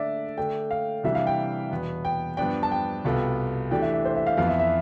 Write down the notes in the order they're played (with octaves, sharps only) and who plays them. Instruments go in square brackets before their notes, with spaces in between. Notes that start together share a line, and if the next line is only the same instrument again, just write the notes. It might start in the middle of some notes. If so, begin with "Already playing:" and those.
Already playing: [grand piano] D3 A3 D4 [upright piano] D5 E5
[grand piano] D3 A3 D4 A4 [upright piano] G5
[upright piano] F5
[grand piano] C3 E3 G3 D4 [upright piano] E5
[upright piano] F5
G5
[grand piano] E2 B2 B3
[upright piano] G5
[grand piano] G2 F3 B3 D4 [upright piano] G5
[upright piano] A5
G5
[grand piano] C2 B2 B3 F4 A4
[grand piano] E3 A3 D4 G4 [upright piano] G5
[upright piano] E5
E5
C5
E5
F5
[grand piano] F2 E3 B3 [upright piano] F5
[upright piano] E5
E5